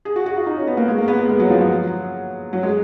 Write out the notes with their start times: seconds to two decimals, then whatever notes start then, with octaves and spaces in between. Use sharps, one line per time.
0.05 G#4
0.16 F#4
0.26 F#4
0.36 F4
0.46 D#4
0.56 C#4
0.67 B3
0.77 A#3
0.88 G#3
0.98 A#3
1.08 B3
1.19 B3
1.29 G#3
1.40 F#3
1.50 F3
1.60 F#3
2.53 F#3
2.63 G#3